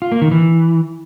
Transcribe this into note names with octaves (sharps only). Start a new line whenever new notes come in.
F4
A#3
D#3
E3